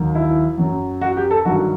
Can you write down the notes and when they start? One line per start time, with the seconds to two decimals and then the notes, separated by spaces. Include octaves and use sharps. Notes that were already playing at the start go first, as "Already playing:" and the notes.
Already playing: D#2 D#3 F#3
0.15 E4
0.58 F#2 F#3
1.01 F#4
1.17 G4
1.31 A4
1.45 G2 D#3 F#3 F#4